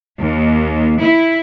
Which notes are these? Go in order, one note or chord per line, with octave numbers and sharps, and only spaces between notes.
D#2
E4